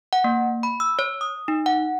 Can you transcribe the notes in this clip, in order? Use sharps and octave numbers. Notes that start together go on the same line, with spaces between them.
F#5
A#3
B5
E6
C#5
D#6
D#4
F#5